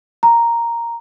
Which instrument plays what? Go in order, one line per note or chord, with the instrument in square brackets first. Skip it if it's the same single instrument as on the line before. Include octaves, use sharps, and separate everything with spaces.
[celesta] A#5